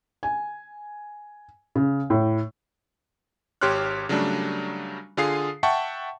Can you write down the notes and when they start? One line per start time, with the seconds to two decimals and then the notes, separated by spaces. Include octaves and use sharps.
0.23 G#5
1.75 C#3
2.10 A2
3.61 G#1 G4 C#5 C6 F6 F#6
4.09 C#3 F#3 G3 A3 D4
5.17 D3 F4 G#4 F5 D#6 C7
5.63 E5 F#5 G5 A5 C#6